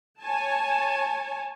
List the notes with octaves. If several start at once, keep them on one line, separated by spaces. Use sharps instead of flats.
C#5 G#5 A5